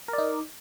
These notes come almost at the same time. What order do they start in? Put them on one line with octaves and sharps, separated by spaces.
A#4 D5 D#4